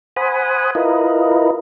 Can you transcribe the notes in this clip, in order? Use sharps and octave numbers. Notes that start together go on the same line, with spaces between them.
C5 F#5 G#5 B5 D#6
E4 F4 A#4 B4 D#5